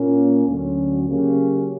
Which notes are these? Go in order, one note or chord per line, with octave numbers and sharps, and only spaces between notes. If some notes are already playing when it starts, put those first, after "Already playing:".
Already playing: A#2 A#3 C#4
D2 D3 F#3 C#4
C#3 F#3 A#3 C#4 G4